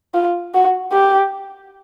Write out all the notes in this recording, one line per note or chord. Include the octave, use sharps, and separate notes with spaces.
F4
F#4
G4